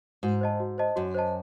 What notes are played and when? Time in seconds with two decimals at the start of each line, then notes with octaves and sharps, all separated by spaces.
0.23 G#2 F#4
0.41 C5 D#5 A5
0.60 F#4
0.78 C5 D#5 A5
0.96 F#2 F#4
1.15 C5 D#5 A5